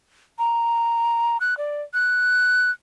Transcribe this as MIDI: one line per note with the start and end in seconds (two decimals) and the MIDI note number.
0.39 1.37 82
1.41 1.57 90
1.58 1.82 74
1.94 2.71 90